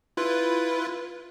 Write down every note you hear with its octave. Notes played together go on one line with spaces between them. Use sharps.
E4 F4 B4